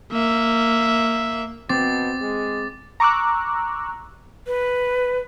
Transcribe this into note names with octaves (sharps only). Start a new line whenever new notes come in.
A#3 E5
B2 C4 D6 A6
G#3
A#5 C#6 D6 E6 F#6
B4